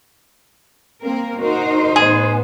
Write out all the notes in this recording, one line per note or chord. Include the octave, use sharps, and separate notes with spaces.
A#3 C4 A#4
D#4 F#4 A#4 C5
A1 B3 G#4